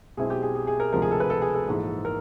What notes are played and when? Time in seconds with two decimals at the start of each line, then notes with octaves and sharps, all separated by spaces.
0.17 B1 B2 G#3 C4 E4 G#4
0.30 G4
0.43 G#4
0.55 G#4
0.67 G#4
0.80 A#4
0.93 D2 C3 F3 G#3 A#4
1.02 G#4
1.11 A4
1.20 B4
1.30 A4
1.42 G#4
1.55 A4
1.68 A#1 G#2 E3
2.05 A#4